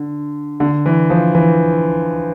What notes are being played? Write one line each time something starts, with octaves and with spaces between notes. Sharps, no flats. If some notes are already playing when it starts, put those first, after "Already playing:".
Already playing: D3
D3
E3
F3
E3